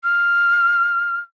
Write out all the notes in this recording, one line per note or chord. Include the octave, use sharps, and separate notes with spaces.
F6